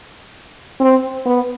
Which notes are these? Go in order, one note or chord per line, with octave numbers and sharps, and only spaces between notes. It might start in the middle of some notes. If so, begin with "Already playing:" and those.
C4
B3